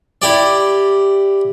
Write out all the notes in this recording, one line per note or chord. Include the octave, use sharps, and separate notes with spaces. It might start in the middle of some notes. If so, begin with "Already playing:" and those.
E4 G4 D5